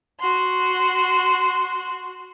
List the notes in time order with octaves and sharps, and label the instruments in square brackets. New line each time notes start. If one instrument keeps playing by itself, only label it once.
[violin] F#4 C6